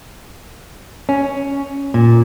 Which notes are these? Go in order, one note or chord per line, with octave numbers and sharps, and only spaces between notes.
C#4
A#2